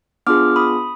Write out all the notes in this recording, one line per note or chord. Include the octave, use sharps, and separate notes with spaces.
B3 D4 F4 G#4 D6 F6
B5 D#6